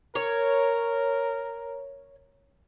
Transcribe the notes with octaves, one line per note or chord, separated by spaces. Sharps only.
A#4 C#5